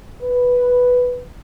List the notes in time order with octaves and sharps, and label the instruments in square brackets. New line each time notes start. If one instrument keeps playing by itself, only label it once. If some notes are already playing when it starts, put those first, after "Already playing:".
[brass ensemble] B4